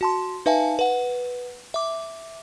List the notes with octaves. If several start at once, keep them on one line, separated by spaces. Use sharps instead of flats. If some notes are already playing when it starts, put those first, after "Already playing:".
F#4 A5 C6
D#4 B4 E5 F5 G#5 A5
B4 F#5
E5 D6